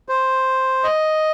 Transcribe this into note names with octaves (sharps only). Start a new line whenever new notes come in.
C5
D#5